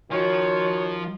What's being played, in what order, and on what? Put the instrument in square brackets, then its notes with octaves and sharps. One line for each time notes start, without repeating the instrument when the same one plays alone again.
[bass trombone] D#3 [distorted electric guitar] F3 [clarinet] F#4 [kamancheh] C#5